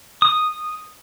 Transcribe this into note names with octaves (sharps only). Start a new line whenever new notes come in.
D#6